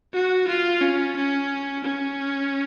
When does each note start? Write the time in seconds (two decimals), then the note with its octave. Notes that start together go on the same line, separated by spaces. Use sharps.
0.14 F#4
0.48 F4
0.81 C#4
1.16 C#4
1.84 C#4